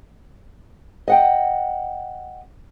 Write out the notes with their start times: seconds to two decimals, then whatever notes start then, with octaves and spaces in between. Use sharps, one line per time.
1.08 D#5 F#5 G5